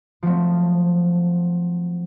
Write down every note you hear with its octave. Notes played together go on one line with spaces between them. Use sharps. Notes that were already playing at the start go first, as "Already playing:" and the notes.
F3 F#3 A3 C4